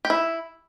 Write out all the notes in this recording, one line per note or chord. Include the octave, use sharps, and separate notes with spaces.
G4
E4